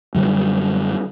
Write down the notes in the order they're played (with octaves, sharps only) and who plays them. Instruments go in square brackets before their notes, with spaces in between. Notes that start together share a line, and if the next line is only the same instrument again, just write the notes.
[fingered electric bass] F#2 D3 G3